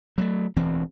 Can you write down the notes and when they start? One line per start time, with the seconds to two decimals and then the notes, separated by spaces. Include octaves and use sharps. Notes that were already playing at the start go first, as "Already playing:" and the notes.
0.18 F#3 G3 A3
0.56 E1 D2 E3 C4